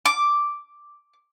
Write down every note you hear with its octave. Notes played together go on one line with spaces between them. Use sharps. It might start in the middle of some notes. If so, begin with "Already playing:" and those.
D6